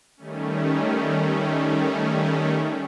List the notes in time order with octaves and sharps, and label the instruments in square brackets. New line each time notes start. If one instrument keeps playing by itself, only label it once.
[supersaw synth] D#3 G3 A3 C#4